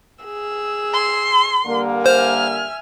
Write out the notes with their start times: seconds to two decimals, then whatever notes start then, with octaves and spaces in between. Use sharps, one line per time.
0.24 G#4 E6
0.94 C6
1.67 D3 G3 A#3
2.06 C5 E5 G#5 F6